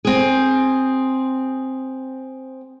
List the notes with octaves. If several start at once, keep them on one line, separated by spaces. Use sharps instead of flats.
C4 G#4